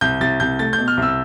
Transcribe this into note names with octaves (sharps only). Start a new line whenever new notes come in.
C2 G6
C2 A6
C2 G6
A3 A6
G6
B2
F6
C2 E6